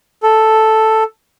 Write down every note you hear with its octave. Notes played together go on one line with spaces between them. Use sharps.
A4